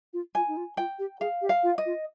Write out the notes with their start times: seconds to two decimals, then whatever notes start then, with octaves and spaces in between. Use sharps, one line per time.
0.13 F4
0.35 F4 G#5
0.48 D#4
0.57 F4
0.77 F4 G5
0.99 G4
1.20 G#4 F5
1.42 G4
1.49 F5
1.63 F4
1.78 D#5
1.86 F4